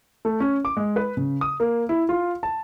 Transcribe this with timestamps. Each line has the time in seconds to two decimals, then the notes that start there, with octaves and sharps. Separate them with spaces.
0.25 A3
0.40 C#4
0.65 D6
0.77 G#3
0.96 B4
1.17 C#3
1.41 D#6
1.60 A#3
1.89 E4
2.09 F4
2.43 A5